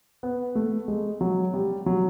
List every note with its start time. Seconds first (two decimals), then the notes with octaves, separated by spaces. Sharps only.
0.23 B3
0.56 A3
0.88 G#3
1.21 F#3
1.54 G3
1.86 F#3